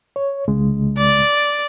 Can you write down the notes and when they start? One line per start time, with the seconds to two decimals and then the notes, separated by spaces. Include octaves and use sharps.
0.16 C#5
0.48 C2 C#3 G#3
0.98 D5